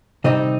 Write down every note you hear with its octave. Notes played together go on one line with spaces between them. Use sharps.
C3 D#3 G3 C4 D#4 D#5